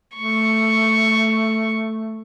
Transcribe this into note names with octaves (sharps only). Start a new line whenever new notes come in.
A3 C#6